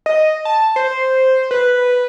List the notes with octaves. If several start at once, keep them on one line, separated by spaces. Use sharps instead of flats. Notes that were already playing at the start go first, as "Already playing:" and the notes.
D#5
A5
C5
B4